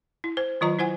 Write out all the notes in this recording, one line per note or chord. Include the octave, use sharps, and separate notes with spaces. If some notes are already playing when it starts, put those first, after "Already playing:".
E4
C5
D#3 F#3 F4 D#5 A#5
E4 C5 F#5 G#5